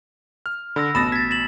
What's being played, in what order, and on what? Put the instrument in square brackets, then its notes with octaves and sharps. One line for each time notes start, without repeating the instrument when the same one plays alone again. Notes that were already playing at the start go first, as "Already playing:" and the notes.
[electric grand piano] F6
[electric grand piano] D3 [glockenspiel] B5 E6 A#6
[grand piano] A1 B2 D#6 [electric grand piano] B5 A6 A#6 [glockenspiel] E7
[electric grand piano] G#6 [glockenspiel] A6 B6
[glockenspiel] E7 F#7